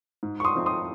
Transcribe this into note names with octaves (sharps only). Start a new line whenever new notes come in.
G#2
C#6
C6 D#6
F3 C4 D#4
C6 D#6